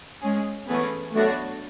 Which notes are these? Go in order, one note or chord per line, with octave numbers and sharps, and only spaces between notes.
G#3 C#4 G#4
E3 A3 B3 C#4 G#4 B4
F#3 A3 B3 D4 F#4 C#5